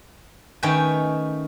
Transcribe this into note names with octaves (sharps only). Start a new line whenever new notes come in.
D#3 A3 C#4 B4 G5 G#5